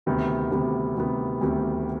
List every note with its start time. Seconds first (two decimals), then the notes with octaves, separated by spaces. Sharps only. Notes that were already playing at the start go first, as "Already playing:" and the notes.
0.06 D2 C3 D#3 G3 B3
0.52 D2 C3 D#3 G3 B3
0.96 D2 C3 D#3 G3 B3
1.41 D2 C3 D#3 G3 B3